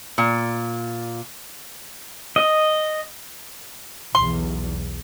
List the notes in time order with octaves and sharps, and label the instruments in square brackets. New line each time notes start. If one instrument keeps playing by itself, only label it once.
[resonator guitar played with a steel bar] A#2
[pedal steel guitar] D#5
[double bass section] B1 E2 [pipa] C6